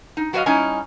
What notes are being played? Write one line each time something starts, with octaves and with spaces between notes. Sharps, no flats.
D#4
F#3 F#4 B4 C5 D#5 F5
G3 C#4 D#4 E4 G#5